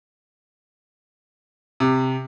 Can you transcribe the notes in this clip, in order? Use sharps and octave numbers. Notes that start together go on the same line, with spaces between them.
C3